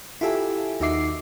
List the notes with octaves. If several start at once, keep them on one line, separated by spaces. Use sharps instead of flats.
E4 F4 G4 A4 E5 G#5
D#2 D#4 F#4 E5 D6 C7